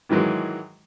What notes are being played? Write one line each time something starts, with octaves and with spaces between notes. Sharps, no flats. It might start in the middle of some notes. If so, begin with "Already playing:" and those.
G#2 D#3 E3 F#3 G#3